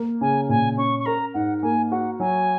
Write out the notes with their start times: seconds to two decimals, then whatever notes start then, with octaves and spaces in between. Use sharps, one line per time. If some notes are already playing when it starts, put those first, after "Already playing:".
Already playing: A#3
0.21 C#3 G#5
0.49 A#2 G#5
0.77 C#4 C#6
0.99 C#6
1.06 A#4 A#5
1.34 G#2 F#5
1.62 A#3 G#5
1.91 F#4 F#5
2.19 F#3 G#5